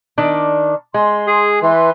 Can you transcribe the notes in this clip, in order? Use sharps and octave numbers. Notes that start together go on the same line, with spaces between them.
D#3 D4 D5
G#3 C6
G#4
E3 B4 C6